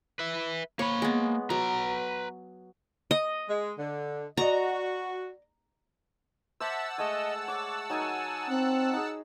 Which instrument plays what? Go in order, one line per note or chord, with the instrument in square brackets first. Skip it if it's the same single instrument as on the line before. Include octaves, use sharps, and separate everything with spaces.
[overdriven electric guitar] B4 E5
[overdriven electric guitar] A#3 B5 [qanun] C#5
[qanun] G#3 B3
[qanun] F#3 [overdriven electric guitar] B4 A#5
[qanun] D#5
[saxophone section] G#3
D3
[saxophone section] F#4 [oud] D5 D#5 [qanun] A#5
[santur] C5 D6 [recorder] E5 [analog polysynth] F#5 A5 E6
[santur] G#3 A3 G#5 [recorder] D#5
[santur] C#5 [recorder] D6
[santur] F#3 D#4 A#4 [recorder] G#5
[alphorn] C4 [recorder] F#6
[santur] D#4 G#4